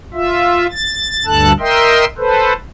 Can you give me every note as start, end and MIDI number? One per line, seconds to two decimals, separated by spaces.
0.14 0.67 65
0.14 0.67 76
0.71 1.26 93
1.26 1.52 38
1.26 1.52 43
1.26 1.52 69
1.26 1.52 81
1.26 1.52 90
1.60 2.05 70
1.60 2.05 75
1.60 2.05 76
1.60 2.05 79
1.60 2.05 84
2.18 2.53 69
2.18 2.53 71
2.18 2.53 72